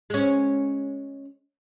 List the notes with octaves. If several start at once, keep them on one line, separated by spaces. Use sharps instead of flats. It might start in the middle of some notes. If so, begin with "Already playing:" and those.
G#3 C#4